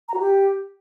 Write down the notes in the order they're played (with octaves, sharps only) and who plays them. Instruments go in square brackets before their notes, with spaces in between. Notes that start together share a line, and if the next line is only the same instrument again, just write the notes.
[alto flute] A#5
F#4
G4